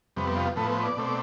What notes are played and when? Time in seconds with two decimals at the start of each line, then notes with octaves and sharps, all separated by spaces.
0.16 F2 C3 G3 B3
0.36 F4
0.56 A2 F3 B3 A4
0.69 C5
0.83 D5
0.97 B2 A3 C4